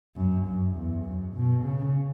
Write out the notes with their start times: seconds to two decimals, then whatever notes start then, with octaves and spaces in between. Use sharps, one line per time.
0.16 F#2
0.46 F#2
0.75 E2
1.04 F#2
1.35 B2
1.64 C#3